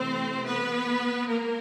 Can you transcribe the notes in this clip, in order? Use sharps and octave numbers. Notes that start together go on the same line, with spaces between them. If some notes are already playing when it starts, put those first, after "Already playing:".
Already playing: C3 E3 A3 C4 C5
B3 B4
G#3 A#3 A#4